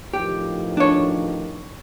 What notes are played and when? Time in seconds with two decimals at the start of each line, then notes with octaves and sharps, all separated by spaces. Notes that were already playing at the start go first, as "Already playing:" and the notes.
0.14 A1 D#3 F3 G4
0.77 D4 C#5